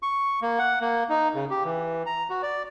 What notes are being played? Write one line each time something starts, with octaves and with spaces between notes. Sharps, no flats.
C#6
A#3
F#5
A#3
D#4
C#3
G4
E3
A#5
F#4
D5